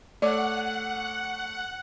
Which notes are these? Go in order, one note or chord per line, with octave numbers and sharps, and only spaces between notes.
A3 C#5 D5 F#5 D6